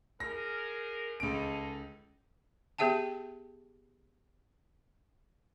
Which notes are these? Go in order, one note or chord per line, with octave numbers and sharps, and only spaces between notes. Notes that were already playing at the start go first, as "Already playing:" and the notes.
F#2 G#4 A#4 A#6
C#2 D#4 G#4 A4 D7
B3 G4 G#4 E5 G5 A5